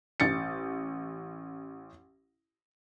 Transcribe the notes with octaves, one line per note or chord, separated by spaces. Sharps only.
A1 A6 C#7